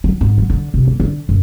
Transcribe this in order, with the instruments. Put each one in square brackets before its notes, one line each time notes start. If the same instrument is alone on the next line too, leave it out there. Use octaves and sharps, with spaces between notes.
[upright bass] F#3
G#2
F#3
D3
C3
A#3
D3
F#2